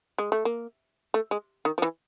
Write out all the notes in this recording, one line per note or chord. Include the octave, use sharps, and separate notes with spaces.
G#3
A3
A#3
A3
G#3
D#3
F3
E3